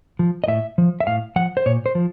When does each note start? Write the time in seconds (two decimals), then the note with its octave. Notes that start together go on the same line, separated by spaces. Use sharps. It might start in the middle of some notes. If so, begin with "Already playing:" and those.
0.19 F3
0.44 D#5
0.48 A2 E5
0.78 F3
1.00 E5
1.07 A2 F5
1.36 F3 F#5
1.57 C5
1.66 A#2 C#5
1.86 C5
1.95 F3